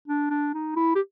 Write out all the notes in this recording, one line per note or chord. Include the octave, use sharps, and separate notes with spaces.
D4
D4
D#4
E4
G4